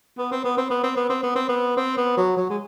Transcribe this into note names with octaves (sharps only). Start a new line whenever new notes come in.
B3
C4
B3
C4
B3
C4
B3
C4
B3
C4
B3
C4
B3
F#3
F#3
G#3